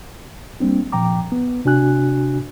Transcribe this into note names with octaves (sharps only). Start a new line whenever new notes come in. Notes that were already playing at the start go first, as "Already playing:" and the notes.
G3 A#3 C4 D4
A#2 F3 G5 A#5 D6
B3
C3 D4 F#4 G#5 F#6